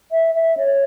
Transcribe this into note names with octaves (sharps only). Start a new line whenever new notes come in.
E5
E5
C#5